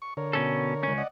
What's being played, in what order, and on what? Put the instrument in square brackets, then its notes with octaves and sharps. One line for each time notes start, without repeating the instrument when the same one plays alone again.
[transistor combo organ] C#6
D3 A#4 C#5
[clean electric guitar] B2 C#4 A4
C#2 C#4
[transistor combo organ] D5 D#5 F#5